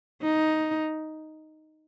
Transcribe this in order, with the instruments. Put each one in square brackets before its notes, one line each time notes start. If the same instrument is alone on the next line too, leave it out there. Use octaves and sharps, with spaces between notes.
[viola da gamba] D#4